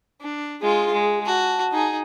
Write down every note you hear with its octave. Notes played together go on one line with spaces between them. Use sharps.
D4
G#3 F4 G#4
G#3
F#4 A5
D#4 G#4